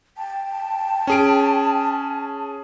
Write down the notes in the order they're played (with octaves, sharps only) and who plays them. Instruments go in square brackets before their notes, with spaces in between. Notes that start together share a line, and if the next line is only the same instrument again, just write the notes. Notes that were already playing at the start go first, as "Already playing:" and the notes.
[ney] G5 [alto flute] A5
[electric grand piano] C#4 G#4 D7